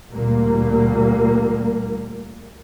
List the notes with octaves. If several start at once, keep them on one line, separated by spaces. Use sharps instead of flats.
D2 A#2 G3 A#3